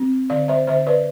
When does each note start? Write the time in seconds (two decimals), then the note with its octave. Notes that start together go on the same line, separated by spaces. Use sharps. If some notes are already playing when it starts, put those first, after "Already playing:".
Already playing: C4
0.30 D3 D5 F5
0.48 C5 E5
0.67 D3 C5 E5
0.87 B4 D5